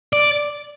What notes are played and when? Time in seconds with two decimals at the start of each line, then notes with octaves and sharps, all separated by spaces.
0.13 D5